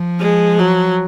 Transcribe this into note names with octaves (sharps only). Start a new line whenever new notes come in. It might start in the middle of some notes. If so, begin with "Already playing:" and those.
Already playing: F3
G#3
F#3